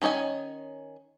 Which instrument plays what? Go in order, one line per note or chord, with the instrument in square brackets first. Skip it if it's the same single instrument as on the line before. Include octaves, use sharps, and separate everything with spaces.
[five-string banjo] D#3 C#4 C#5 D#5 G#5